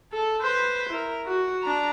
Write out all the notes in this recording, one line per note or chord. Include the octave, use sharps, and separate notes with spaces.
A4
B4 C5
E4 A#4
F#4
D4 A#5